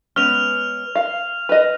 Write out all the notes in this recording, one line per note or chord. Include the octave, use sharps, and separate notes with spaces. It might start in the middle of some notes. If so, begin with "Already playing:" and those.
G#3 B3 C#4 F6 F7
F5
B4 D#5